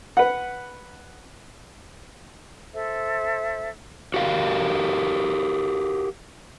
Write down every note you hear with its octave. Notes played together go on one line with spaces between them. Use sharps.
B4 F#5
A4 C5 E5
F#4 G4 A#4 F5